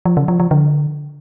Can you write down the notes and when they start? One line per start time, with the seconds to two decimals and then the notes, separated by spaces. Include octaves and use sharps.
0.05 F3
0.17 C#3
0.28 F3
0.40 F3
0.51 D3